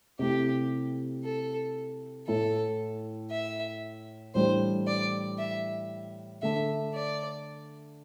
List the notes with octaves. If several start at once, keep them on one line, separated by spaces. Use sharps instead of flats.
C3 A3 E4 G4
A4
A2 A3 E4 A4
E5
A2 E3 G3 D4 C5
D5
E5
D3 A3 D4 E5
D5